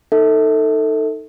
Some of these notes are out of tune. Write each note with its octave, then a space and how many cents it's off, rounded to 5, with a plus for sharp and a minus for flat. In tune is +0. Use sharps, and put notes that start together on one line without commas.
D#4 +0 A4 +20 E5 -35